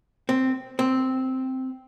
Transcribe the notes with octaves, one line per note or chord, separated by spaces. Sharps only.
C4
C4